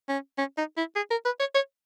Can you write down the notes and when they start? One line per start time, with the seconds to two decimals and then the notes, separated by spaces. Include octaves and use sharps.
0.09 C#4
0.38 C#4
0.58 D#4
0.77 E4
0.96 G#4
1.11 A#4
1.25 B4
1.40 C#5
1.55 C#5